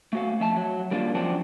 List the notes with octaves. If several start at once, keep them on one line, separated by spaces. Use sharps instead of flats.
A3 F#4 F5
F2 E5 A5
F#3
G3 A#3 D4 F4
F#2 F3 C4 D4